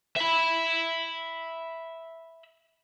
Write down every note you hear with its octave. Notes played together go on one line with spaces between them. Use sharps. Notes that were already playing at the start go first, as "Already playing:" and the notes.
E5 B5